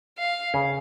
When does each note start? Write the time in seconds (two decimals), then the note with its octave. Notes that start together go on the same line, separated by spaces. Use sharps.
0.18 F5
0.54 C#3 C#4